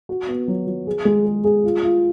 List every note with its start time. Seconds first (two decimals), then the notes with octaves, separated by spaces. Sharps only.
0.09 F#4
0.28 B3
0.48 F#3
0.67 F#3
0.87 G#4
1.05 G#3
1.25 G#4
1.44 G#4
1.64 F4
1.83 F4